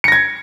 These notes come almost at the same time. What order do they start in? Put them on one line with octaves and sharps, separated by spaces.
C#7 A#6 G#6